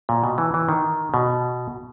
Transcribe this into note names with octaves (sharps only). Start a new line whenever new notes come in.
A#2
B2
E3
E3
D#3
B2